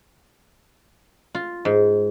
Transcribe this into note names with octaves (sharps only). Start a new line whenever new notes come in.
F4
G#2